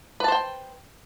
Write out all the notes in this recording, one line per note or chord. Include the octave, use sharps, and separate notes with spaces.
B4 C5 G5 A5